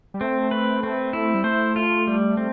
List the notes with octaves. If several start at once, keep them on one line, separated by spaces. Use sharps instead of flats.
G3
A3 C4
B4
C4
E4
G3
A3 C5
F4
G3
C4